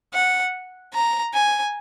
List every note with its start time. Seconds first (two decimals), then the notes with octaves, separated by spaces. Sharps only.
0.14 F#5
0.93 A#5
1.34 G#5